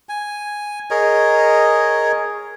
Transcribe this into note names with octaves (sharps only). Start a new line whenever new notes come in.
G#5
G#4 A#4 C#5 D#5